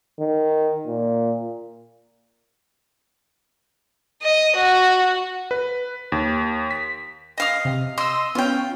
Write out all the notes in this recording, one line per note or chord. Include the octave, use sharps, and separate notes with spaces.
D#3
A#2
D#5
F#4
B4
D#2
B6
D#5 F5 D#6
C3
D#5 C6 E6
B3 C#4 F4 G5